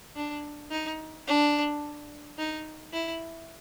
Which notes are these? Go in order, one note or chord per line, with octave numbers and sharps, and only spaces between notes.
D4
D#4
D4
D#4
E4